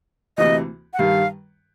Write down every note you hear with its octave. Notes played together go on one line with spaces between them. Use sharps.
D2 C3 E3 D#5
F#5
G2 D#3 G3 F5